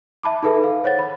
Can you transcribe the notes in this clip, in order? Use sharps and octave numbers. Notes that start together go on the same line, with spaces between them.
E5 A5 B5 D6
D#4 G#4 A4 B4 E5
F5
C5 C#5 F#5 A6
B5